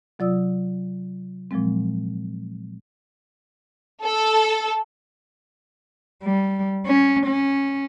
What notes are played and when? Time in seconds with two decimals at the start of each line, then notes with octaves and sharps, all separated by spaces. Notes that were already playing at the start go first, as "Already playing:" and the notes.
0.19 C3 F#3 F4 D5 D#6 E6
1.51 A#2 F3 F#3 G#3 C4
4.03 A4
6.23 G3
6.86 C#4
7.26 C#4